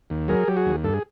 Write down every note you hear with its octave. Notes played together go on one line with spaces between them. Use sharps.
D#2
F#3 G#4 A#4
F#3 G4
F#4 G#4
D#2
G2 A4
G#4